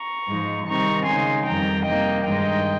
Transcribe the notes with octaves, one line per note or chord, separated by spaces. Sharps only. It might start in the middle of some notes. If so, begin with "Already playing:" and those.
Already playing: A#5 C#6
G#2 F3 G#3 D#4
C3 D#3 G3 C4 D#4 A#5 C#6
C#3 G#3 D#4 G#5 C6
F2 D#3 G3 G5 A#5
C3 G3 A#3 D#4 D#5 G5
G2 D#3 G#3 D#4 D#5 G5